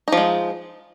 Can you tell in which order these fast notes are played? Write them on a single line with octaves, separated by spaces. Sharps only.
D#4 F3 G#3